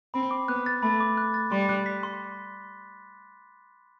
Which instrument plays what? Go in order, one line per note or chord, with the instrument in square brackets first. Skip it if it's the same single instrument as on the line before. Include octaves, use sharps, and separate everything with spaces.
[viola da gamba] C4 [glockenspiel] B5
[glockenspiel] D6
[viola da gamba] B3 [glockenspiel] F#6
[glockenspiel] A6
[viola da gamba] A3 [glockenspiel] B5
[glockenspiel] D6
F#6
A6
[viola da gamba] G3 [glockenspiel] C6
[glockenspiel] F#6
B6
C6